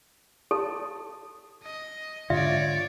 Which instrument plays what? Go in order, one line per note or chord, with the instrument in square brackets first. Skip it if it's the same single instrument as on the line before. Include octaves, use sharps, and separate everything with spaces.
[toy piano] A4 [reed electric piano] A5 D#6
[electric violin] D#5
[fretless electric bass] G#2 D3 [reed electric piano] F4 [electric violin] C#5 D5 [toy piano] E5